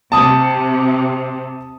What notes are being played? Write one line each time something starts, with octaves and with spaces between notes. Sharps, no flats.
C3 A5 D#6